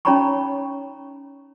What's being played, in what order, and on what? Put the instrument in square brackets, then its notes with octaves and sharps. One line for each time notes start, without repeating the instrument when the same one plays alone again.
[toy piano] C#4 D#4 C#5 A#5 B5 C#6